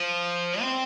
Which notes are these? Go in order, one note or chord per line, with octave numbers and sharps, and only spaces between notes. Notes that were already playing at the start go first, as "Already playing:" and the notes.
Already playing: F3
C4